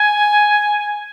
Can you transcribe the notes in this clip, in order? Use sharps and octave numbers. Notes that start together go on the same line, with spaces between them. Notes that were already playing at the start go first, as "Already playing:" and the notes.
Already playing: G#5